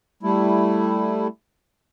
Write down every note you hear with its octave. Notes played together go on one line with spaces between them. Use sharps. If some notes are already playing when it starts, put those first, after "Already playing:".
G3 A3 E4